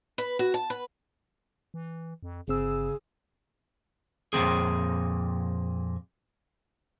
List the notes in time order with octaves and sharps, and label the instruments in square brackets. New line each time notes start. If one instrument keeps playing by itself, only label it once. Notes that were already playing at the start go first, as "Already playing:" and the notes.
[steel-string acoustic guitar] B4
F#4
A5
B4
[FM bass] E3
F2
[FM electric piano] G1 C4 E6 [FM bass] C#3 [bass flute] G#4
[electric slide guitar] F2 A#2 F3 C4 G#4